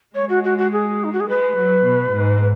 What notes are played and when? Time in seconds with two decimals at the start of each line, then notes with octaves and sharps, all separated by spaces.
0.15 G#3 C#5
0.29 F#4
0.44 F#4
0.58 F#4
0.72 G#4
1.04 D#4
1.13 F#4
1.20 G#4
1.29 G#3 B4
1.59 F#3
1.86 B2
2.15 G#2